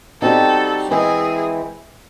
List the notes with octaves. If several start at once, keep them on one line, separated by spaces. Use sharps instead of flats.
G3 C4 D#4 F#4 A4
E3 G#3 C4 E4 G#4